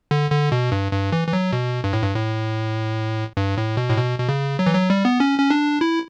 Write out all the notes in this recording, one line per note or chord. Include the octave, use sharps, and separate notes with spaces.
D3
D3
B2
G2
G2
E3
E3
F#3
B2
G2
A2
G2
A2
G2
A2
B2
A2
B2
B2
C#3
F#3
E3
F#3
G3
B3
C#4
C#4
D4
E4